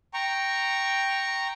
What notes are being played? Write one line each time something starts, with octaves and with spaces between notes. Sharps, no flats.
G5 A#5 C#6